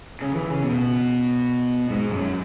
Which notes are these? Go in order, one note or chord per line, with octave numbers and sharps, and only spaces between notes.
C#3
E3
C#3
B2
G#2
F#2